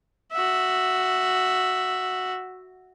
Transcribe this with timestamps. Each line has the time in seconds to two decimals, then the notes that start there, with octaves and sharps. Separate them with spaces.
0.32 F#4 E5